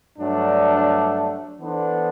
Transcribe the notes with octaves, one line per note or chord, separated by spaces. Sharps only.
G2 F#3 A3 D4
E3 B3 D4 A4 C5